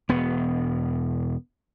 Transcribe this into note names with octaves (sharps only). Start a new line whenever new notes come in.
E1 B3